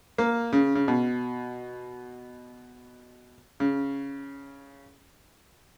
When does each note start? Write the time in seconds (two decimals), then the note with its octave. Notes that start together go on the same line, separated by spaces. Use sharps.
0.18 A#3
0.53 C#3
0.75 C#3
0.88 B2
3.60 C#3